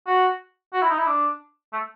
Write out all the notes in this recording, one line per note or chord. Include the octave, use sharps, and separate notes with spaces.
F#4
F#4
E4
D#4
E4
D4
A3